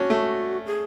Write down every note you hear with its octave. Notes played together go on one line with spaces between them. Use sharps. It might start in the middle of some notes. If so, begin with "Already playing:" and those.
Already playing: C#4 D4 F#4
A3
G#4